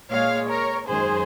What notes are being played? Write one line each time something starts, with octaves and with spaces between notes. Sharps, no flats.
A#2 G#3 C#5 F5
A#4 C#5
F#2 D#3 G#3 G#4 C5